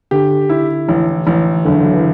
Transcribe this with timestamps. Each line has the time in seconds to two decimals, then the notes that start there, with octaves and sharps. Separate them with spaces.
0.11 D3 G4
0.50 E4
0.89 A1
1.27 A1
1.65 F#1 D3
1.85 F#3
1.94 E3